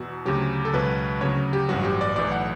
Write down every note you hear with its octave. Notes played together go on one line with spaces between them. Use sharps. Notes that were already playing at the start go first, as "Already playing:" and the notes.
Already playing: E2 B2 F#4
D2 C#3 F#3 G4
A4
C#2 B2 F#3 B4
D2 C#3 F#3 C#5
G4
A1 G2 F#3 F#4
G4
D5
B1 A2 E3 D5
F#5